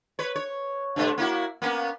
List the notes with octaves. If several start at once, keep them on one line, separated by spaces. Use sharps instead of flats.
B4 C#5
C#5
G2 C3 A3
A#3 E4 F#4
A#3 B3 C#4